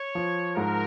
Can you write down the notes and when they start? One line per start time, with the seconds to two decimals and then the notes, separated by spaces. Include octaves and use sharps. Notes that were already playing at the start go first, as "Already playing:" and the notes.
Already playing: C#5
0.15 F3
0.56 G#2 A#4